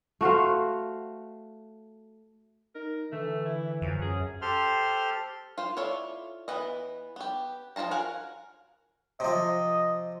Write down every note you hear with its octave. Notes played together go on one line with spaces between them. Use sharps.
A3 F#4 C5 F5
D#4 A#4
D3 E3 A3
E4
F#2 F3
C#4 G#4
G4 A4 C5 C6 F6
F4 C5
E4 F4 A4 C#5 D5
E3 B3 B4 D#5
B3 G4
F3 D#4 F4 A5 A#5
F#4 A#4 F5 F#5 G#5
C3 F3 D#5